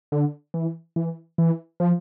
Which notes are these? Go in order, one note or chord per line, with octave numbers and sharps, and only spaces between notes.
D3
E3
E3
E3
F3